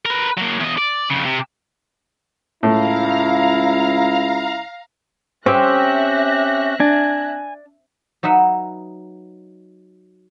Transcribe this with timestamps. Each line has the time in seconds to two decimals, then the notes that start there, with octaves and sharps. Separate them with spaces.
0.06 A#4 B4
0.38 F#3 A#3
0.60 E2 D#5
0.78 D5
1.10 F2 C#3
1.25 C3
2.63 C#2 A2 E4 F5 A#5
5.46 C4 C#4 G4 E5 F#6 A#6
6.80 D4 G#5
8.23 F#3 D#4 B4 E5 F#5